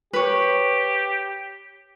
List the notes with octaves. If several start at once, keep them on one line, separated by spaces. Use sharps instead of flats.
G4 B4 C#5